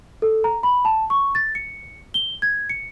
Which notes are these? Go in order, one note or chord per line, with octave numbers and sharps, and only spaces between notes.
A4
A#5
B5
A5
C#6
A6
C#7
G7
G#6
C#7